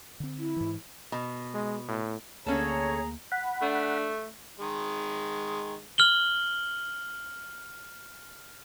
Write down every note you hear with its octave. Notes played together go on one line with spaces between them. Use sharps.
D3 C4
E4
G#2 E3
B2
G#3
A2
D2 D3 A#3 C#4 G#4 A4 C#5 A#5
F#5 B5
A3 D4
D#3 G#3
F6 F#7 G7